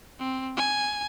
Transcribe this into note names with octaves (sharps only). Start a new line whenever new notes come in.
C4
G#5